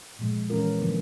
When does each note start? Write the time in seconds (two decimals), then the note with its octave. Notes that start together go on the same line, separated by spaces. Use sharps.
0.19 A#2 F3 G#3
0.50 E3 G#3 C#4 F4 A#4
0.80 D3 F3 A#3